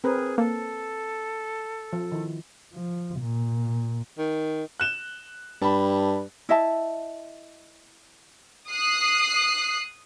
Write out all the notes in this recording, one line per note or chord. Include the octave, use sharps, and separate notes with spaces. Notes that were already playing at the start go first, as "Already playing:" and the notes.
C4 G#4 A#4 B4
A#3 A4
F3
D#3 E4
F3
A#2
D#3
F#6 E7 G7
G2 A5 B5
E4 D#5 E5 A5
D#6 F#6 C7